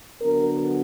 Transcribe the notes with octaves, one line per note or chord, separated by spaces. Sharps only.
D3 F#3 B3 D4 A#4